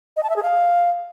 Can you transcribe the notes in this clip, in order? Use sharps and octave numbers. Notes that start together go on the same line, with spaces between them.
D#5
A5
E5
G#4
F5